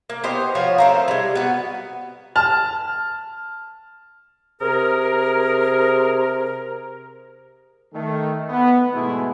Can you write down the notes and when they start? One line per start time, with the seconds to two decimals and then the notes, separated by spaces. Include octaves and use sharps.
0.10 A#3
0.24 B3 G4 C5 D#5
0.55 F3 F4 F#4 C#5
0.78 A3 C4 A#4
1.08 G3 G#3
1.35 B3 F#4
2.36 A5 F6
4.61 C3 G#4 A#4
7.93 D#3 A3
8.49 B3
8.93 G#2 B2 E3 G#3 A3 E4